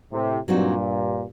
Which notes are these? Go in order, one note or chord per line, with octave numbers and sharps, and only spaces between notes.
A2 C3
G2 A#2 F#3 A3 C4 D#4 F#4